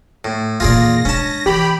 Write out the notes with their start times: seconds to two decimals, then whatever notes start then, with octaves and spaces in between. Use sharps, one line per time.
0.25 A2
0.60 E2 A#2 F4 G#4 D5 A#6
1.05 G#3 C#4 D4 A5
1.46 E3 G4 B5